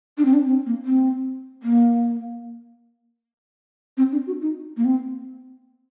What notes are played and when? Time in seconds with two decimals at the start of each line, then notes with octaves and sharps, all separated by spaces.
0.18 D4
0.25 C4
0.34 D4
0.47 C4
0.66 A#3
0.85 C4
1.63 A#3
3.97 C4
4.12 D4
4.27 F#4
4.42 D#4
4.77 A#3
4.85 C4